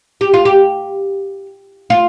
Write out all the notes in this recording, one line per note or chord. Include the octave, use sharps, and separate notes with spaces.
G4
F4
G4
F4